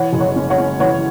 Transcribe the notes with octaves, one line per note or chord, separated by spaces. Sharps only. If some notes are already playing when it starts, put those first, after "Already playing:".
Already playing: E3 C#5 F#5
F#1
C#5 F#5
C#4
C#5 F#5
C#4
E3 C#5 F#5